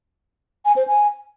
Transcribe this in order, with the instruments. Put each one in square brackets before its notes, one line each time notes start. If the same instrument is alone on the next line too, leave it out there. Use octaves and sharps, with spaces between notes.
[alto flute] G#5
C5
G#5